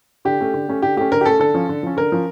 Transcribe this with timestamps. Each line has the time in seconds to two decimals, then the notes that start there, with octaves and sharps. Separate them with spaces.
0.25 D3 G4
0.40 A3 C#4
0.54 D3
0.68 A3 C#4
0.82 D3 G4
0.97 A3 C#4 G4
1.12 D3 A#4
1.21 G4
1.26 A3 C#4 A4
1.39 D3 A4
1.54 F3 C#4
1.69 D3
1.83 F3 C#4
1.97 D3 A#4
2.12 F3 C#4